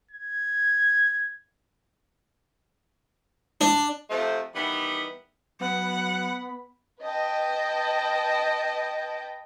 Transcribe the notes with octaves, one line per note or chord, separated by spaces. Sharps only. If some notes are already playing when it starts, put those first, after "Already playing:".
G#6
D4
C3 F3 A3 C4
D#3 E3 G3 B3
F#3 B3 F#5 B5
B4 D#5 G5 A5